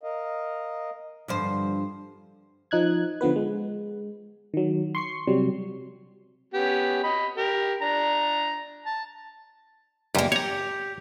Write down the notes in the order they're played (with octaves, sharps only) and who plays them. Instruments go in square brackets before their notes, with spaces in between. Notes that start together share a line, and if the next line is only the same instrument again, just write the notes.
[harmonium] A#4 D#5 F5
[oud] G2 F3 C5 [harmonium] D3
[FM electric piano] F3 D#4 F#6 G#6
D3 F3 B3 B4
G#3
D#3 F#3
C6 C#6 C7
C3 F#3 G3
[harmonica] B3 C#4 G4
D#5 B5
G4 A#4
D4 A#5
A5
[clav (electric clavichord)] C#2 F#2 [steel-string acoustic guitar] G3 A#3
[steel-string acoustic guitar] G4 [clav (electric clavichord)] C#5 A#5